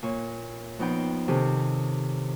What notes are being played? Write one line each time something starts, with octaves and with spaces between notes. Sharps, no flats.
A#2 C#5
F2 B3 D#4 G5 C6
C3 D#3 C4 C#4 G4 A4